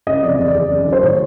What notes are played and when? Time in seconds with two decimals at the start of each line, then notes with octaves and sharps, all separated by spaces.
0.07 C#3 D#5
0.23 F2 D5
0.36 E2 D#5
0.48 D5
0.55 E2
0.70 F#2
0.86 D#3
0.93 C5
1.02 A2 C#5